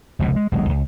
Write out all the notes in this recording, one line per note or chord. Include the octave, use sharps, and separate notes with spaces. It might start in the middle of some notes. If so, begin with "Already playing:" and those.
F1 C#2 B2
G#3
D#1 B1 G#3
C#2